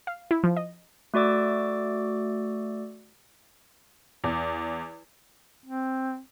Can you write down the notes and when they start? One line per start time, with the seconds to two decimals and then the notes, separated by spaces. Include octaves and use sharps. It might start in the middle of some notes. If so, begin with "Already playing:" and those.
0.07 F5
0.31 E4
0.44 F3
0.57 D#5
1.14 A3 F#4 D5 D6 E6
4.24 E2
5.66 C4